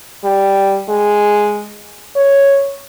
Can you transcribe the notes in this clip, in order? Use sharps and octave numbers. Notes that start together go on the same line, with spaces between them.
G3
G#3
C#5